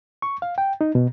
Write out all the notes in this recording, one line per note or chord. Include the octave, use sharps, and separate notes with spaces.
C#6
F5
G5
D#4
B2